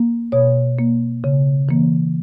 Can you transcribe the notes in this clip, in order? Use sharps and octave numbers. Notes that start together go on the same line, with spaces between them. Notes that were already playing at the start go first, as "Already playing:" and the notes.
Already playing: A#3
B2 C#5
A#3
C#3
E3 A#3